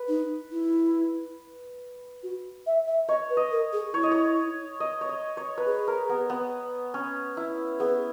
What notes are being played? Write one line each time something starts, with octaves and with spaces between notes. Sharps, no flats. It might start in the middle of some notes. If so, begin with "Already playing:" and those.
Already playing: B4
D#4
E4
F#4
E5
E5
C#5 D#5
B4
D#5
A#4
G#4
E4 C#5
D#5
C#5
D#5
C#5
D#5
C#5
B4
G#4 C#5
A#4
B3
B3
C#4
E4
B3 G#4